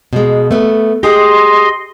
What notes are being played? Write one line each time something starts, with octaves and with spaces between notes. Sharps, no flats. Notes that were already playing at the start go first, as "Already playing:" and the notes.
B2 G#3
A3 B3
G4 G#4 D#5 C6